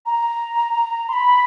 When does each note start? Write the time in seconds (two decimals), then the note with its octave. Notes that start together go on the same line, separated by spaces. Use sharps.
0.06 A#5
1.09 C6
1.13 B5